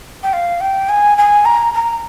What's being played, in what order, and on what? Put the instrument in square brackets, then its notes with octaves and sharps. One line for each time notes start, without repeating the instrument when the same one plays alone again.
[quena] G5
F5
G5
G#5
G#5
A#5
A#5